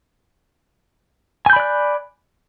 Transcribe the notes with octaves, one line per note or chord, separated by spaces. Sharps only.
D5 G#5 B5 F#6 G6